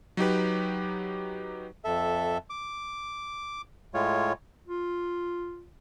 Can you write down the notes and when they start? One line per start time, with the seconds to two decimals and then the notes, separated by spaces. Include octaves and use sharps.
0.17 F#3 D#4 G4 B4
1.84 F2 A4 E5
2.50 D6
3.94 A2 G#3 F4 C#5
4.68 F4